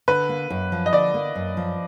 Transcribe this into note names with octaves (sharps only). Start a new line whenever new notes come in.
D3 B4
A#3
F#2
F3
D#5
D3 D5
A#3
F#2
F3